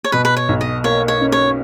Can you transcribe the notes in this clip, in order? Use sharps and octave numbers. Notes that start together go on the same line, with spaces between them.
C#5
B2 B4
B4
C#5
B1
D#5
A#3 C#5
C#5
C#4
C#5